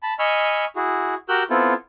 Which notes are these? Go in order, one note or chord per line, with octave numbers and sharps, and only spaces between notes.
A5 B5
D#5 G#5 B5 C#6 E6 F6
E4 F#4 G#4
F#4 G4 A#4 E6 F#6 G6
B3 C4 E4 F4 A4